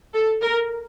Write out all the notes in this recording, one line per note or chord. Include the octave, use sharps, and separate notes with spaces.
A4
A#4